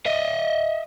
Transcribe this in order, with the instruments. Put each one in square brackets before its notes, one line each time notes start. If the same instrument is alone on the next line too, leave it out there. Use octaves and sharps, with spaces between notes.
[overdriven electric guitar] D#5 E5